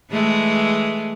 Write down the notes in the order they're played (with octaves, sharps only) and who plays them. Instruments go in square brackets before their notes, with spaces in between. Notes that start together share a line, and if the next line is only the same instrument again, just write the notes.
[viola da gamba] E3 G#3 A3